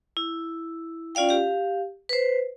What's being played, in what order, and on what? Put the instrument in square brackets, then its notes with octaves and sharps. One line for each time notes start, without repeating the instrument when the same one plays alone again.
[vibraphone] E4
C#4 F4 D5 F5 G5
G4 F5
B4 C5